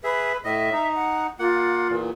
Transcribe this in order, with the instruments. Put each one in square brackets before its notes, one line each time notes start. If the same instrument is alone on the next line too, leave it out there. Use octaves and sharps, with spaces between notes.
[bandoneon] G#4 E5 [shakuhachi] B4
[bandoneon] A2 D#5 [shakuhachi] E5
[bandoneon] D#4
[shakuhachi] F#5
[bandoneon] A#3 F#5 [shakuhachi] F4
[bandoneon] E2 A#2